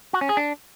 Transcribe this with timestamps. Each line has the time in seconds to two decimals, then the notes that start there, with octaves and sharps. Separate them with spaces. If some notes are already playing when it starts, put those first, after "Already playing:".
0.13 F#4
0.21 C#4
0.29 G#4
0.37 D4